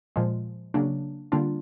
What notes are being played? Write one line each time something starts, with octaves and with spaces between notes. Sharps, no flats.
A#2 F3 G#3
C#3 F#3 A#3 D4
D3 G3 A#3 D4 F4